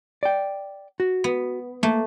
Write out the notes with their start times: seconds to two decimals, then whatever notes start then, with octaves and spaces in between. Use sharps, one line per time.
0.23 D5 G5
1.00 F#4
1.24 B3
1.83 A3 A#3